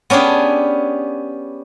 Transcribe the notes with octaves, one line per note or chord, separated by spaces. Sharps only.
B3 C#4 D4 G4 G#4